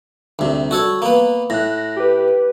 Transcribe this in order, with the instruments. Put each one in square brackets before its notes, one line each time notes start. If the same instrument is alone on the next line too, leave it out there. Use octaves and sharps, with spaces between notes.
[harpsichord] D2 C3 [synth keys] G3
[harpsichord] F#4 A4 C#5
A#3 B3
[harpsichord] A2 [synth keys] F#6 A#6
[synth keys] G4 B4